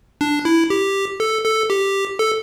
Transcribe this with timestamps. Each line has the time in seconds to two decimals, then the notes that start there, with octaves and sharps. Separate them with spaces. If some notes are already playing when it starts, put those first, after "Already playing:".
0.21 D4
0.45 E4
0.70 G4
1.20 A4
1.45 A4
1.70 G4
2.19 A4